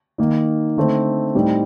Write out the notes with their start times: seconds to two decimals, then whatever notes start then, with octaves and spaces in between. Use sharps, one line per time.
0.18 D#3 A#3 D#4
0.77 D3 A3 C4 D#4
1.35 A2 G3 C4 D#4